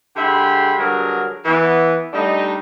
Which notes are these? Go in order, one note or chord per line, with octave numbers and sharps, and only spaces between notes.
D3 G#3 G4 E5 B5 C6
G2 D3 F#3 G#4 A#4
E3 B3
G3 A3 D4 D#4